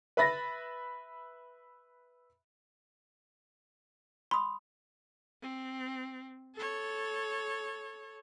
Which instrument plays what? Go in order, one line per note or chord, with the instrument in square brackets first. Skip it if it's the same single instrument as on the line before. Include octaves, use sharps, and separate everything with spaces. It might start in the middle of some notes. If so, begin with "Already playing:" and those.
[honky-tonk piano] B4 E5 B5 A6 A#6
[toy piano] B5 D#6 [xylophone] C6
[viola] C4
A4 C#5